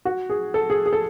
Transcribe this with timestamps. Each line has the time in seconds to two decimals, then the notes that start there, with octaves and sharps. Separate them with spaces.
0.05 F#4
0.30 G#4
0.54 A4
0.70 G#4
0.86 G#4
0.93 A4